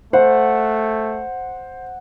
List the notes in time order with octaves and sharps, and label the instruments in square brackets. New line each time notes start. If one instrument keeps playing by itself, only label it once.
[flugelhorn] A3 [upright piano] C5 [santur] F#5